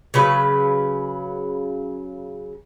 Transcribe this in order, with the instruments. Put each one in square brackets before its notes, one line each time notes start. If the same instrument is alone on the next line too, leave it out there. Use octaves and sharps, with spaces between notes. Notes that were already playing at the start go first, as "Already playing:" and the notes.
[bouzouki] C#3 F#3 B4